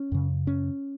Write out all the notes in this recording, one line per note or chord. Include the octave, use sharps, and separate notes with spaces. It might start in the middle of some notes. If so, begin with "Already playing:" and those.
Already playing: C#4
F#2 C#3
C#4